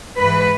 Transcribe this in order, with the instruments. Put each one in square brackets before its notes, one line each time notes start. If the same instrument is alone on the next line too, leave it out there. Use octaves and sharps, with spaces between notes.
[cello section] G#2 E3 B4